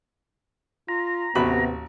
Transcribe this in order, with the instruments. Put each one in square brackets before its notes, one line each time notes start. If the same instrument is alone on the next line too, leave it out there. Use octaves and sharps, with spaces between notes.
[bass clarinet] F4 [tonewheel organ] A#5
[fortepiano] A1 F#4 B5 [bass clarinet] D#2 [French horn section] C3 B3